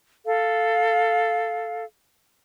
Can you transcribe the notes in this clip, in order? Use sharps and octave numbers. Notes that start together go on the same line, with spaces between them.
A4 F5